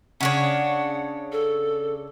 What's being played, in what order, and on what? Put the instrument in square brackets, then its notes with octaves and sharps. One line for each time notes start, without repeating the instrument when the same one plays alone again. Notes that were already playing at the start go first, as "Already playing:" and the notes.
[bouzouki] C#3 D4 C#5 [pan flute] F#5
[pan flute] A4